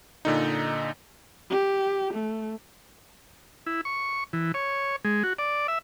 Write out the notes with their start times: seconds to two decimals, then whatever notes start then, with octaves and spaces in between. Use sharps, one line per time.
0.25 A#2 D3 D#4
1.50 G4
2.14 A3
3.66 E4
3.85 C#6
4.33 E3
4.54 C#5
5.05 G#3
5.23 F#4
5.39 D5
5.68 E5